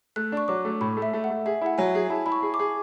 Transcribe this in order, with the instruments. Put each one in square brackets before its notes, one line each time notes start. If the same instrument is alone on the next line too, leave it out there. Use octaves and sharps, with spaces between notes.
[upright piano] A3 [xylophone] F#6
[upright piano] D4 [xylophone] C#6
[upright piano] F#3 [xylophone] D6
[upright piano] A3
[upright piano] A2 [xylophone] B5
[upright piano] A3
[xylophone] E5
[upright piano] A3
[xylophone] F#5
[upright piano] A3
[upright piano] G#4 [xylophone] E5
[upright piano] E4 [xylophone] F#5
[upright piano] F#3 [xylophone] G#5
[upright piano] G#4
[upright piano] E4 [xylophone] A5
[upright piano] E4 [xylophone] B5
[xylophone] C#6
[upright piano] G#4
[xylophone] D6
[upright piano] G#4